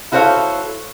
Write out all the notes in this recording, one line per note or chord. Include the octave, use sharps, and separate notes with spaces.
E4 F#4 A4 C5 C#5 F5